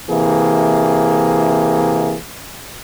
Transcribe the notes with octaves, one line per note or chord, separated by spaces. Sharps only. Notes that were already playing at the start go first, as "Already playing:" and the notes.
C3 E3 A#3 G#4